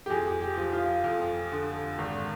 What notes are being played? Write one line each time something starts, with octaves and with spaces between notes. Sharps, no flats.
G4
F2 G#4
G4
F3
F4
F2
D3
G#1